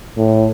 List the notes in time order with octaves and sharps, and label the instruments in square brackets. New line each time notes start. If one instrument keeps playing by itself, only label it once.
[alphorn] A2